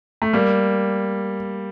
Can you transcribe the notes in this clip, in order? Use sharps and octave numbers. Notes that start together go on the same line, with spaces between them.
A3
G3 A#3